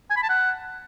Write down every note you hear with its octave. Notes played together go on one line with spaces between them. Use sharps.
G#5
B5
A5
F#5